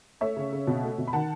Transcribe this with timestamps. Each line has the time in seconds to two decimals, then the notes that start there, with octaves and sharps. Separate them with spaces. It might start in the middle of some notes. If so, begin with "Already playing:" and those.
0.21 A3 C#5 E5
0.37 C#3
0.52 C#3
0.67 B2
0.83 A3
0.98 B2
1.08 B5
1.13 D#3 F#5 A5